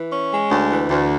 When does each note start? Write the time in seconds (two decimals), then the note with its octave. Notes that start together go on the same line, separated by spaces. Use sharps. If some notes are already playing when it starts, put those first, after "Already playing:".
Already playing: E3
0.12 C#4
0.31 G#3
0.51 D2
0.70 E3
0.89 D2